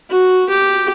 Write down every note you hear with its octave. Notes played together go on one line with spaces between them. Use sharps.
F#4
G4